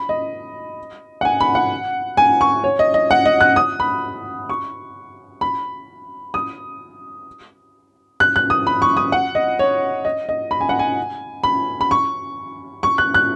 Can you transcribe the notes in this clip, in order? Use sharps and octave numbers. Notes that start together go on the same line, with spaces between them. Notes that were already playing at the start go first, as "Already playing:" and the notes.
Already playing: B5
D#5
F#5
G#5
B5
F#5
G#5
C#6
C#5
D#5
D#5
F#5
D#5
F#6
D#6
B5
C#6
B5
D#6
F#6
F#6
D#6
B5
C#6
D#6
F#5
D#5
C#5
D#5
D#5
B5
G#5
F#5
G#5
B5
B5
C#6
C#6
F#6
F#6